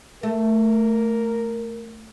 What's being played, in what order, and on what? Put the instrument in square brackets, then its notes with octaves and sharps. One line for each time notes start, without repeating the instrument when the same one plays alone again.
[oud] A3 [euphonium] A#4